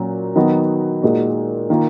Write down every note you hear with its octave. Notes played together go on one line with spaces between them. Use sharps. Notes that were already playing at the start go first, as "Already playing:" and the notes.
Already playing: A#2 F#3 C#4 F#4
D#3 F#3 B3 D#4 F#4
A#2 G#3 D#4 F#4
D#3 A#3 F4